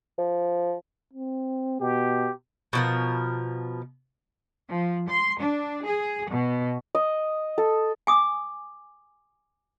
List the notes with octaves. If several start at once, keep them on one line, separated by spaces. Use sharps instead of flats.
F3
C4
B2 G4
B2 F3 A#4
F3
C6
D4
G#4
B2
D#5
A4
G#5 D6 D#6